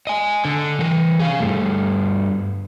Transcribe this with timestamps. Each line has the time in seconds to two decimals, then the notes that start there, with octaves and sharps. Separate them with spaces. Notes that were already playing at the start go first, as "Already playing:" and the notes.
0.07 D#5 G#5
0.45 D3
0.79 E3 A#4
1.20 G#4 F5
1.40 G2 A3